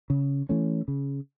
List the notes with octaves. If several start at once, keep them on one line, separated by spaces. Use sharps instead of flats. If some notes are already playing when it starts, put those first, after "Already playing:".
C#3
E3 A3 C#4
C#3